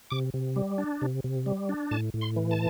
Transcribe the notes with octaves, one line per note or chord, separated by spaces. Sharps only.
C3 D6
C3
G3
D4
C3
C3
G3
D4
A2 A5
A2
C6
E3
A5